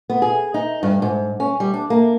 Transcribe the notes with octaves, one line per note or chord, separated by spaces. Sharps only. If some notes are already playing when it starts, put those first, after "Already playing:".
B3
G#4
D#4
G2
G#2
C#4
G3
D4
A#3